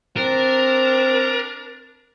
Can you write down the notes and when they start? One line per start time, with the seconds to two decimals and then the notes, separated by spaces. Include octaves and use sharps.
0.17 C4 D4 A#4